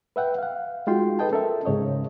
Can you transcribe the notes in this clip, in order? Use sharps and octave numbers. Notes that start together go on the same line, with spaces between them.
B4 E5 F#5 G5
F5 F#5
G#3 D#4 F4 F#4 G5 C6
G#4 A4 B4 D#5 G5 A5
C#4 A4 A#4 E5
G#2 C#3 C#5 D#5